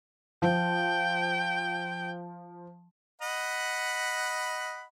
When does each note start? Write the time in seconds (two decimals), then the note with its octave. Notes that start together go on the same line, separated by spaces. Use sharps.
0.42 F3 G5
3.22 D#5 F#5 B5